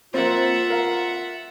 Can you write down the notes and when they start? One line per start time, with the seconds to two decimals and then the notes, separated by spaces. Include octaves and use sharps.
0.14 A#3 C4 F4 E5 F#5
0.70 A#4 F5